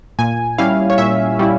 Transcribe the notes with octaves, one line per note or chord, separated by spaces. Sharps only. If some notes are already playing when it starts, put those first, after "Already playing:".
A#2 G#5
G3 C#4 E4 F5
C#5
A#2 E5
G3 C#4 E4